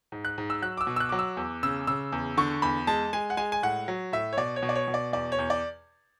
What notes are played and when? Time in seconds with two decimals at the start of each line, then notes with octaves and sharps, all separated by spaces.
0.12 G#2
0.25 F#6
0.38 G#2
0.50 E6
0.62 F#3 F#6
0.77 D6
0.81 E6
0.87 B2
0.96 E6
1.00 F#6
1.09 F#3 D6
1.19 E6
1.37 E2
1.63 C#3 E6
1.87 C#3 E6
2.12 E2
2.38 D3 C#6
2.62 E2 B5
2.87 G#3 A5
3.13 G#3 G#5
3.30 F#5
3.37 G#3 G#5
3.52 G#5
3.63 A2 F#5
3.88 F#3
4.12 A2 E5
4.33 C#5
4.37 B2 D5
4.56 C#5
4.63 B2
4.69 D5
4.75 C#5
4.88 B2
4.94 D5
5.13 E2 D5
5.32 C#5
5.39 E2
5.50 D5